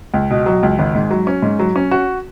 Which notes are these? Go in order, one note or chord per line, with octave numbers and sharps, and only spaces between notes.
C#2
B2
F#3
C#2
G#1
G#2
F#3
C#4
G#2
F#3
C#4
F#4